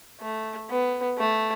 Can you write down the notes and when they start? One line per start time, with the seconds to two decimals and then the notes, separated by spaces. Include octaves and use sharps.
0.21 A3
0.69 B3
1.18 A3